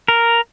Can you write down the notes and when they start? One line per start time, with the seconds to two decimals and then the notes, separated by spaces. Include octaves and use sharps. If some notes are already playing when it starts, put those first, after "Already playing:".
0.08 A#4